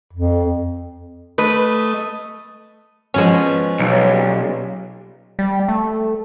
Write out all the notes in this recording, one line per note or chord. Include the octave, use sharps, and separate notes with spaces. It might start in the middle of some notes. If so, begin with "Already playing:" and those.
F2
A3 B4 D#5
B2 F3 G#3 B3 C#4
B1 A#2 C#3 G3
G3
A3